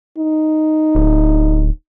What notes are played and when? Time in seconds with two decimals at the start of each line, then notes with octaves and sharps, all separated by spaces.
0.18 D#4
0.95 D1